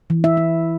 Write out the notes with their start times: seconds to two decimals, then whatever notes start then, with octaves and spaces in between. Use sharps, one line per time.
0.10 E3
0.24 E4 E5
0.37 E4